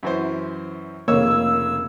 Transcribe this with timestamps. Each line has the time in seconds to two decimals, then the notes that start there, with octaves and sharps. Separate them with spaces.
0.03 F#2 E3 C5
1.08 F1 C#3 A#3 C#5 E6